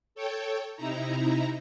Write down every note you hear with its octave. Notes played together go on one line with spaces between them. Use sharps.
A4 C#5 G5
C3 D#4 E4 A#5